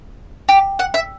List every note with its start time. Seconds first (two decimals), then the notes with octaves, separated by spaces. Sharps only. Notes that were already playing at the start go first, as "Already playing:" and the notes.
0.49 G4
0.79 F#5
0.94 E5